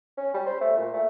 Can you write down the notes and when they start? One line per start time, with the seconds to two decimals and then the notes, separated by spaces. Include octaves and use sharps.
0.17 C#4
0.34 G3
0.46 C5
0.61 A3
0.76 A#2
0.94 A3